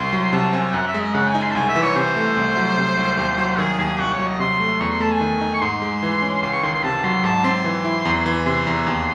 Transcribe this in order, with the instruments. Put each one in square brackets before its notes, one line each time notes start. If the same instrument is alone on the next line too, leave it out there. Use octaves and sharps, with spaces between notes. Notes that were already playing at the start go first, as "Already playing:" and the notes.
Already playing: [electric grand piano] C2 [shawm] C6
[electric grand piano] F#3
[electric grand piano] C3 [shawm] A5
[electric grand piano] C4 [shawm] G#5
[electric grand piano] F#2 [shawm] F#5
[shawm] E5
[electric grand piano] G#3
[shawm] D#5
[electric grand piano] C#3 [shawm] F#5
[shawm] G#5
[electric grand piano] D#4
[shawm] C6
A5
[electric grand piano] C2 [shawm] G#5
[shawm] E5
[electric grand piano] E3
[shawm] C#5
[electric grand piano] C3 [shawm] C5
[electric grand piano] A3
C2
F#3
C3
C2
D#2
F#3
[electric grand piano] D#3 [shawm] G#4
[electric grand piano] D#2 [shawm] G#4
[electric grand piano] C2 [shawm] F#4
[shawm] C#5
[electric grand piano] F#3
[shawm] D#5
[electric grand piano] C3 [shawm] C6
[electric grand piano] A3
[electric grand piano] E2 [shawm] C#6
[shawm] C6
[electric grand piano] A3 [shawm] A5
[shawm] G#5
[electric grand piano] D#3
D#4
[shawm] C#6
[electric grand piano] G#2 [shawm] C6
[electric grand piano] G#3
E3
C#4
[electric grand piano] C#2 [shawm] C6
[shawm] C#6
[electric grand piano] D#3 [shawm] C6
[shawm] C6
[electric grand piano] C3 [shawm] A5
[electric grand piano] F#3 [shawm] C6
[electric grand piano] G#2 [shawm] A5
[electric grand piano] C4 [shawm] C6
[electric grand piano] E3
E4
E2
E3
[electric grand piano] C3 [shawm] C6
[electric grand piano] E2
D#2